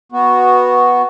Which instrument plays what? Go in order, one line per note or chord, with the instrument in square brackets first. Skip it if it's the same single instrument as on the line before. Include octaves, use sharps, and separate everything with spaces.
[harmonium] B3 F#4